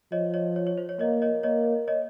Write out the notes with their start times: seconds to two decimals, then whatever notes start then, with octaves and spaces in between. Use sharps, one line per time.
0.12 F3 C#5 D#5
0.34 C#5 D#5
0.56 C#5
0.67 C#5
0.78 C5
0.89 C#5
0.99 A#3 C#5 D#5
1.22 C#5 D#5
1.43 A#3 C#5 D#5
1.88 C#5 D#5